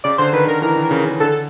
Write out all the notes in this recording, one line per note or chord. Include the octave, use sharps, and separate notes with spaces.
C#3 D5
D3 C5
D#3 B4
D3 A#4
E3 A#4
D#3
C#3
C#3
D3 A4